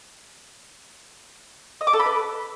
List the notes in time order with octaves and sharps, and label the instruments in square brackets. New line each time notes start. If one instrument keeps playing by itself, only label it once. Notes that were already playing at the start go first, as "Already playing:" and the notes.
[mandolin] D#5
D6
A4
B5
B4